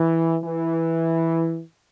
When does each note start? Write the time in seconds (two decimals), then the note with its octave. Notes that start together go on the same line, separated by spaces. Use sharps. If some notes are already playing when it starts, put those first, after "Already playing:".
Already playing: E3
0.43 E3